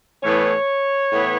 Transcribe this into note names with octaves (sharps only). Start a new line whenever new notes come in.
A2 E3 B3 C#5
A2 E3 B3